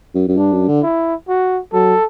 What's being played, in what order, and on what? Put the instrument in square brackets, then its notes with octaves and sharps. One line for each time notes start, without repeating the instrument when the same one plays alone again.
[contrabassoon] F#2
F#2
[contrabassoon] G2 [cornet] D4
[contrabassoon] F#2
D3
[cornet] E4
F#4
[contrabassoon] F#3 [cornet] A4